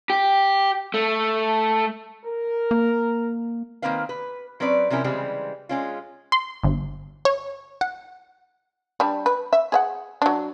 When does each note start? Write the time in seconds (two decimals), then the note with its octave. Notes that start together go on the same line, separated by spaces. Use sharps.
0.10 G4
0.94 A3
2.25 A#4
2.71 A#3
3.82 D#3 G#3 A#3 C4 B4 F5
4.09 B4
4.60 F#3 C4 C#4 B4 D5
4.90 C3 F3 C#4 E4 A#4
5.04 C#3 E3 G3 G#3 C4
5.69 G#3 C#4 F4
6.32 C6
6.64 G1
7.25 C#5
7.81 F#5
9.00 G3 D4
9.26 B4
9.53 E5
9.72 G#4 E5 F#5
10.22 F#3 D4